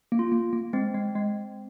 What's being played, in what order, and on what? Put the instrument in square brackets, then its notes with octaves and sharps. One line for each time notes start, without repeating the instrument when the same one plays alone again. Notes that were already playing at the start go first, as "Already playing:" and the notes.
[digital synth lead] A#3
[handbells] F4
[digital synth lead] A#3
A#3
[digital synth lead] G#3 [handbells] C4
[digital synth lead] G#3
G#3